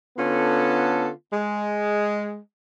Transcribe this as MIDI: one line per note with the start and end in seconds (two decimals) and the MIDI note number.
0.17 1.09 50
0.17 1.09 59
0.17 1.09 61
0.17 1.09 65
0.17 1.09 69
1.32 2.37 56